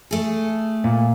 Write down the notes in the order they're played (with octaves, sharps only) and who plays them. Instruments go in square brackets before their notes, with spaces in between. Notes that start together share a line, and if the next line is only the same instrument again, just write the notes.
[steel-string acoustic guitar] A3 G#4
[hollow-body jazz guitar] A#2